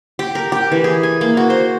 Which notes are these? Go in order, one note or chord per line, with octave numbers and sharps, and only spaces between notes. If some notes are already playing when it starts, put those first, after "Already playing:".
G4
A#4
G4
E3
G#4
G#5
A#3
F#4
C5